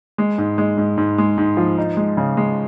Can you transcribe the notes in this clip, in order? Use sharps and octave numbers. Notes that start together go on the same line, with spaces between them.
G#3
G#2
G#3
G#2
G#2
G#3
G#2
F3
D#4
G#3
C#3
G#3